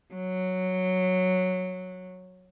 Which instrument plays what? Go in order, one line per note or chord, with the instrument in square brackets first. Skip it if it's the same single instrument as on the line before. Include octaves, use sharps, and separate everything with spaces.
[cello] F#3